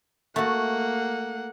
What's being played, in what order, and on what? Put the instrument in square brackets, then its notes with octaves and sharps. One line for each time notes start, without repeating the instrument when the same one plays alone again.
[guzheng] A3 F#4 [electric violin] A#3 F#5